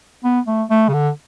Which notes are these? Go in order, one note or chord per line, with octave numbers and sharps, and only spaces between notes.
B3
A3
A3
C#3
D3